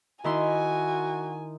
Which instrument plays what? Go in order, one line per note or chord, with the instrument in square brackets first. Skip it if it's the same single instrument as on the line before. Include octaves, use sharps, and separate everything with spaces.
[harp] D#3 E4 C6 [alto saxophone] F#4 [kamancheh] G#5